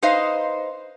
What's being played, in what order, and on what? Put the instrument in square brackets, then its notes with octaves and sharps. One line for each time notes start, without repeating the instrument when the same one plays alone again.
[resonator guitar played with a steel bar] D#4 B4 C5 D#5 F5